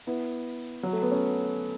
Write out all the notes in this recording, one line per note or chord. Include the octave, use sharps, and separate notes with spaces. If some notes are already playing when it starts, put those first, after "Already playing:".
B3 E4
F#3
A3
B3
C#4